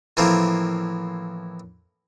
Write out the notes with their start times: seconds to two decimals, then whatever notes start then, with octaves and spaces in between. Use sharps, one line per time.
0.17 A2 E3 F3 A#3 C4